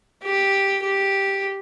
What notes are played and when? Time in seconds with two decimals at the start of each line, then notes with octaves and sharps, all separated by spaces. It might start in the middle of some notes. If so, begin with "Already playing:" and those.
0.23 G4
0.82 G4